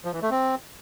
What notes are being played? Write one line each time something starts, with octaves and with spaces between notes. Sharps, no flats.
F3
E3
A3
C4